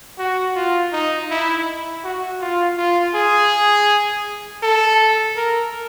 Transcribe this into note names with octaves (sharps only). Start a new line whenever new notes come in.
F#4
F4
D#4
E4
F#4
F4
F4
G#4
A4
A#4